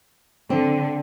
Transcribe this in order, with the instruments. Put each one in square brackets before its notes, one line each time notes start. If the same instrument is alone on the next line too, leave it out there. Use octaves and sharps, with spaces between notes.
[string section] D3 [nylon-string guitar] C4